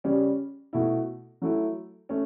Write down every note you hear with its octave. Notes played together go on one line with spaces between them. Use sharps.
C#3 G3 C#4
B2 A3 E4
F#3 A3 E4
A3 C#4